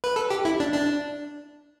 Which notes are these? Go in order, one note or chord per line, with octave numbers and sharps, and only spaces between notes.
B4
A4
G4
E4
D4
D4